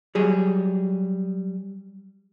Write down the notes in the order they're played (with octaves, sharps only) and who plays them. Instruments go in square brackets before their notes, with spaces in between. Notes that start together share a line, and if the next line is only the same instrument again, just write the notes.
[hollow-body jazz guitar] F#3 G3 G#4